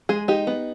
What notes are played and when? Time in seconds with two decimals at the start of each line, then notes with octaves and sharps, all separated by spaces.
0.09 G#3 G#4
0.28 D#4 G4
0.47 B3